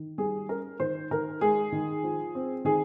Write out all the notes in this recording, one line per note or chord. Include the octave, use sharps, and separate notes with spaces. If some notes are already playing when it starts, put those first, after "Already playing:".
Already playing: D#3
G3 G#4
C#4 A#4
D#3 C5
D#3 A#4
G#3 G#4
D#3
F3
C4
D#3 G#4